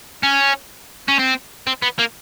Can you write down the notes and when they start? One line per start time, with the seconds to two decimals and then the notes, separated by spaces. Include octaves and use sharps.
0.23 C#4
1.09 C#4
1.19 C4
1.67 C4
1.83 B3
1.99 A#3